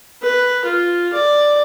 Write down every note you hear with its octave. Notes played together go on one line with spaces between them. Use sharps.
B4
F4
D5